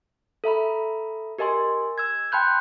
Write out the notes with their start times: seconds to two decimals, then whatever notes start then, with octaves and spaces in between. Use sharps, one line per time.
0.44 A4 E5 A#5 B5
1.38 G4 A#4 D#5 G#5 C6
1.98 E6 G#6
2.32 G5 A5 B5 C6 F#6 G6